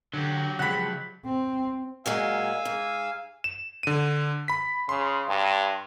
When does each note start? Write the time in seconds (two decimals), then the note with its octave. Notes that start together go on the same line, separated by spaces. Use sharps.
0.14 D3 F#3 G4
0.59 C#3 F3 G#3 F#5 B5
1.25 C4
2.06 A#2 F#3 G#3 F5 G#5 E6
2.65 G#2
3.44 E7
3.83 D3 D#7
4.48 B5 B6
4.89 C#3 C6
5.29 G2